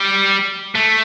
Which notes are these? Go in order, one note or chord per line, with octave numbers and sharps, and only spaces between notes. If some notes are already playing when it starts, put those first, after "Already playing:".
Already playing: G3
A3